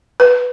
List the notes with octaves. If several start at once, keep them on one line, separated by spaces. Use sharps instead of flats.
B4